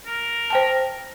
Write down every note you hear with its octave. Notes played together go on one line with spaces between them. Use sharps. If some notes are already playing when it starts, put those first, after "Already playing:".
A#4
C5 G5 A5